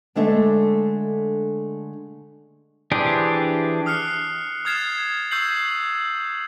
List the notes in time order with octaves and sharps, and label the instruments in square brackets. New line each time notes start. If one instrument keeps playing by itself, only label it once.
[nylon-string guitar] D3 G#3 A3 D4 A4 E5
[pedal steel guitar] E3 D4 G4 G#4 C5
[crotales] D#6 F6 F#6 C7 C#7
D#6 F6 G#6 A6 C7 E7
C#6 E6 G6 C7 F#7